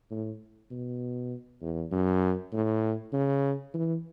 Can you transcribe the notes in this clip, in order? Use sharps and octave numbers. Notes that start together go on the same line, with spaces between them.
A2
B2
E2
F#2
A2
C#3
E3